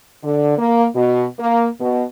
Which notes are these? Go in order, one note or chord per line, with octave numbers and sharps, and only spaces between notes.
D3
A#3
B2
A#3
B2